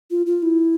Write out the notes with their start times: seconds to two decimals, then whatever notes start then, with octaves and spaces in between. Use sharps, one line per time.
0.11 F4
0.26 F4
0.43 E4